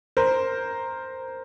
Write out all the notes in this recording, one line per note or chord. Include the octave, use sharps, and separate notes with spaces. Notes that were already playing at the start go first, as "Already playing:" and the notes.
A#4 C5